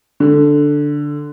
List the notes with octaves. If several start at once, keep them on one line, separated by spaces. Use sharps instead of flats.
D3